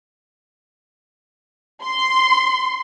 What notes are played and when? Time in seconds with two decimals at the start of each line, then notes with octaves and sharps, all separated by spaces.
1.84 C6